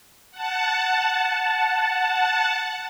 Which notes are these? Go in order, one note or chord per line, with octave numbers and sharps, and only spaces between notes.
F#5 A5